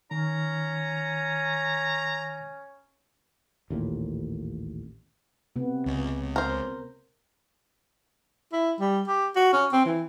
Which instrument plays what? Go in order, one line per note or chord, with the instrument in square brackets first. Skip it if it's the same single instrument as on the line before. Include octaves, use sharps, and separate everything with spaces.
[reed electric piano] D#3 [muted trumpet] C#4 [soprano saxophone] A#5
[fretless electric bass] A1 D#2 A#2
[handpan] C3 B3
[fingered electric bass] C#2
[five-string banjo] A#4 C5
[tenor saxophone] E4
G3
G4
F#4
C#4
C4
E3